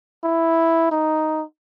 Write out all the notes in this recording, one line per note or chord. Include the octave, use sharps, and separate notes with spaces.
E4
D#4